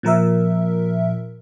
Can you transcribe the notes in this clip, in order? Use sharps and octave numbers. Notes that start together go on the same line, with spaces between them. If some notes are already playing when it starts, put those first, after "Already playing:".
A#2 F3 A#4 E5